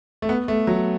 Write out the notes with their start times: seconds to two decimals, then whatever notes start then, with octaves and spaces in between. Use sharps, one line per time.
0.22 A3
0.29 B3
0.48 A3
0.67 F#3